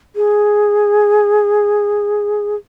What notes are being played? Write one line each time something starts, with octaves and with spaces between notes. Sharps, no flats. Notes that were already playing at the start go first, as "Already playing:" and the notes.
G#4